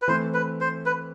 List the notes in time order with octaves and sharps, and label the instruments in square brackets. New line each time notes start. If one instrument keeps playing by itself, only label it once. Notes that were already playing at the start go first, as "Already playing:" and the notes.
[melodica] B4
[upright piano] E3 A3 C4 [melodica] C5
[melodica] B4
C5
B4